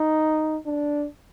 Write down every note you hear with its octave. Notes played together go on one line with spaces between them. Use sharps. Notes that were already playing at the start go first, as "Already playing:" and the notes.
Already playing: D#4
D4